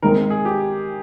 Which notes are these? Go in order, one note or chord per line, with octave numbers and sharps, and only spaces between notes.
D#3 G#3 C4 A#4
G#4
G4